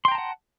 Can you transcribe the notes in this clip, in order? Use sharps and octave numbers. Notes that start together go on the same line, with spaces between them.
F#5 G5 A5 A#5 C6